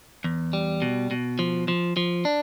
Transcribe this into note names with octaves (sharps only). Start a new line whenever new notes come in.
E2
G3
B2
B2
F3
F3
F3
D4